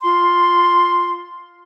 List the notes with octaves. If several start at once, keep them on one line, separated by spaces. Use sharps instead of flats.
F4 C6